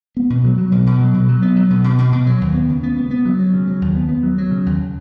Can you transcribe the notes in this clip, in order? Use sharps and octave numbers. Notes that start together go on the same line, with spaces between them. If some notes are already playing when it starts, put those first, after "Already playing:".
B3
B2
F#3
F#3
B2
B2
F#3
B2
F#3
B3
F#3
B2
B2
B2
B2
F#3
D#2
B3
C#3
B3
B3
B3
F#3
F#3
C#3
F#3
D#2
B3
B3
F#3
F#3
C#3
D#2